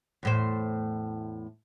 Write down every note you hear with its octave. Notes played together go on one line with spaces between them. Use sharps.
E2 A2 C5